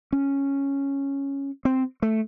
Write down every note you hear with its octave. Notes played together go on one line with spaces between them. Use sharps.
C#4
C4
A3